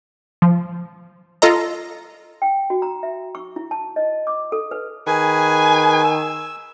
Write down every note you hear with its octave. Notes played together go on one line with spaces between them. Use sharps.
F3
F4 A4 D#5 A#5
G5
F#4
A#5
E5
C#6
E4
A5
D#5
D6
A4
B4
D#3 G#4 B4 G#5
E6